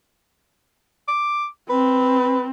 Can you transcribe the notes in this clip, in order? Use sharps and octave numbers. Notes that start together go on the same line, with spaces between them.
D6
C4 B4